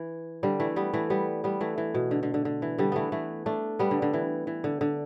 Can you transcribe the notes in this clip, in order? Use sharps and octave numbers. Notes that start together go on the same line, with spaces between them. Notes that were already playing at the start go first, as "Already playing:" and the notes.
Already playing: E3
D3 G3
E3 A3
G3 B3
E3 A3
G3 B3
G3 B3
E3 A3
E3
B2
D3
D3
D3
D3
E3
D3 G3
E3 A3 B3
E3 A3
A3 D4
G3 B3
D3
D3
E3
E3
D3
D3